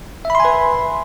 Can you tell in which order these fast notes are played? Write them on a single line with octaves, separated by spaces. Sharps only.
E5 B5 C6 G#5 B4